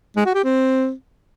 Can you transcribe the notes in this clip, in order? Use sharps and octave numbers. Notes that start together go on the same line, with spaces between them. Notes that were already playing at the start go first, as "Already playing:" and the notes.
G#3
F#4
G4
C4